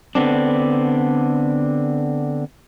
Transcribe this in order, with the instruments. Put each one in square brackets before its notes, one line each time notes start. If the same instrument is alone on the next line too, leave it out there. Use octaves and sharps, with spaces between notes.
[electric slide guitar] D3 B3 C4 D4